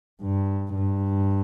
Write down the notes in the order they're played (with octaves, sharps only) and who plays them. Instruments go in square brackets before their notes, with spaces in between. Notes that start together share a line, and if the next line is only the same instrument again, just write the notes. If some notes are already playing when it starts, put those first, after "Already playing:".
[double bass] G2
G2